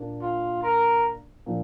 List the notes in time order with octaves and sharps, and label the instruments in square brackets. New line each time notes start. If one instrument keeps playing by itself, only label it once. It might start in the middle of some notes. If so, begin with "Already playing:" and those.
Already playing: [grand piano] A#2 A#3 D4
[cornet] F4
A#4
[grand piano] A#2 F3 D4